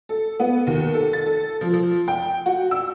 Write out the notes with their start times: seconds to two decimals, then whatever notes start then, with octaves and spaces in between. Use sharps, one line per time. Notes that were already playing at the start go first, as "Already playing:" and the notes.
0.09 A4
0.40 B3
0.67 D#2
0.94 A4
1.13 A6
1.26 A4
1.61 F3
1.74 F3
2.08 G5
2.46 F#4
2.71 E6